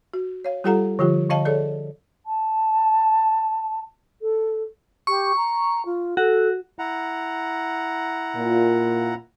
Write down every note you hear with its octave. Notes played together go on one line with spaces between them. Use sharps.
F#4
C#5 F5
G3 F4 G4 A4 F#5 A#5
D3 F3 F4 G4
D3 D#5 F5 A5
G#4 A4 C#5 D5
A5
A4
G4 C#6
A#5
F4
F#4 A4
E4 F#5 A#5
A#2